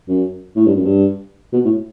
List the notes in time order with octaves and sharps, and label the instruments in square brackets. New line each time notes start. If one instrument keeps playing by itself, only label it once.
[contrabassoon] F#2
A2
G2
F#2
G2
B2
A2